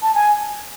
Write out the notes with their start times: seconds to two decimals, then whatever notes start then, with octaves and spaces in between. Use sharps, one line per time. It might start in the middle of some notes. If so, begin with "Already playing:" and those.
0.02 A5
0.15 G#5